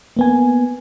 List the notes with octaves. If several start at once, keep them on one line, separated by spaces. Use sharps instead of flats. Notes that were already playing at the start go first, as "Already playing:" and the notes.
A#3 B3 G#5